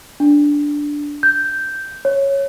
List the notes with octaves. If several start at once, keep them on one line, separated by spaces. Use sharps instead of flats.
D4
G6
C#5